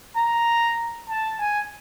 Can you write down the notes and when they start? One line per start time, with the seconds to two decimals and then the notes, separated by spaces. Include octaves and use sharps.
0.17 A#5
1.10 A5
1.41 G#5